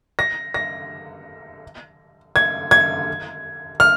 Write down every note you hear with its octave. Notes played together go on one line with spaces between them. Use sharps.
A#6
A#6
G#6
G#6
F6